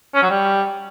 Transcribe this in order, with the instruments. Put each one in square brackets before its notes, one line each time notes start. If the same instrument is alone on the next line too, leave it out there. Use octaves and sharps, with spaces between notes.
[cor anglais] C#4
F#3
G3